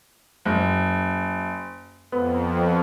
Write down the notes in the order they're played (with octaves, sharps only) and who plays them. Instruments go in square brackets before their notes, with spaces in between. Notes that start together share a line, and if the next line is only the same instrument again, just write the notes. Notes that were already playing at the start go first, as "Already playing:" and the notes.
[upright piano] F#1
[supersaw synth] F2 [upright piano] B3